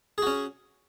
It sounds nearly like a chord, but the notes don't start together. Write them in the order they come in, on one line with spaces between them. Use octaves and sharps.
G#4 F#4 C#4